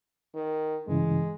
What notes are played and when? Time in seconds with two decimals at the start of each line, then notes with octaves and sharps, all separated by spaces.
0.35 D#3
0.88 G2 C#3 E3 G#3